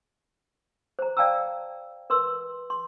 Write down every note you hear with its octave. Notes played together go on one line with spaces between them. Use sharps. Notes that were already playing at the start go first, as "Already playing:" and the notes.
C5 A#5
D5 F5 G5 A5 A#5 E6
A#4 B4 C6 E6
C6